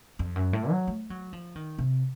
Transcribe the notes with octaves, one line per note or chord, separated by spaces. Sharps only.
F2
F#2
A2
F#3
A3
F#3
F3
D#3
C3